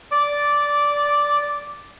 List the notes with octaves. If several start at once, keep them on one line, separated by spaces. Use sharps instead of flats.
D5 D6